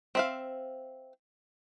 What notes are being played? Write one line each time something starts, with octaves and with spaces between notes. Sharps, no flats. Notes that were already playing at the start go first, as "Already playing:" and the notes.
C4 E5 F5